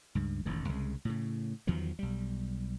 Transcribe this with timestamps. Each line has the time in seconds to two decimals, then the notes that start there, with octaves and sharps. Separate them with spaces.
0.15 C#2 G2
0.46 E1 A1 D#3
0.69 C2 C#3 G#3
1.05 A2 C#3
1.67 E2 D#3 F3 F#3
1.99 B1 G3